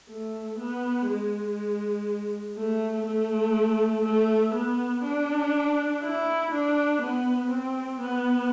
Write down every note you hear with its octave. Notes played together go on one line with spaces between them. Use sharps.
A3
B3
G#3
A3
A3
A3
B3
D4
E4
D4
B3
C4
B3